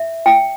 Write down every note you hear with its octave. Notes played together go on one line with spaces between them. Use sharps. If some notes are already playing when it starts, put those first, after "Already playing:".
Already playing: E5
G5